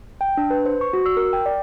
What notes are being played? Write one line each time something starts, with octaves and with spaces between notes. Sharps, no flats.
G5
D4
B4
C5
C#6
F#4
E6
A#4
G5
D5